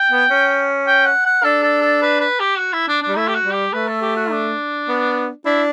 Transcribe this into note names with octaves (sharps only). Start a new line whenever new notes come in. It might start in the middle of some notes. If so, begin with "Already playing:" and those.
Already playing: G5
B3
C#4
G5
F#5
F#5
D4 A4
A4
A4
B4
B4
G4
F#4
E4
D4
D4
G3
A3 E4
G4
F#4
G3
G4
A3 B4
A4
G4
F#4
D4
B3
D4 E4